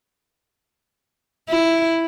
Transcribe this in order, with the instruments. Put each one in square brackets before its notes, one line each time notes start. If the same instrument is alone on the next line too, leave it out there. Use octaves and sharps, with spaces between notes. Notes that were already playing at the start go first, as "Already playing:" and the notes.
[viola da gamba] E4